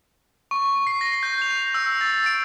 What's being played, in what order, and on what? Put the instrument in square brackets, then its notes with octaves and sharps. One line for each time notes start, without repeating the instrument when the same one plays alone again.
[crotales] C#6
C7
A#6
G6
F7
E6
A6
D7